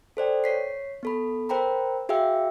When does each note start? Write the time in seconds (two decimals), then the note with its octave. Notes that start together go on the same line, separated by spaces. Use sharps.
0.17 A4 C5 D5 G5
0.44 C#5 B6 C7
1.03 B3 A4 B5
1.49 A#4 C5 G5 A#5 B5
2.09 F#4 G#4 E5 F5 G5 E6